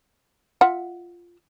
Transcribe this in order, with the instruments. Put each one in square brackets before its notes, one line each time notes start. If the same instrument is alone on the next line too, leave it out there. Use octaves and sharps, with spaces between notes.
[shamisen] F4 E5 F#5